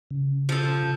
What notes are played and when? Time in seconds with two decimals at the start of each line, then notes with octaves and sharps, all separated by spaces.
0.11 C#3
0.49 F3 A4